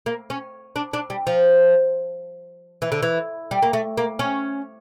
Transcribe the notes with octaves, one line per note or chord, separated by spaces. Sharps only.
A#3
C#4
D4
D4
G3
F3
E3
D3
E3
G3
A#3
A3
A#3
C#4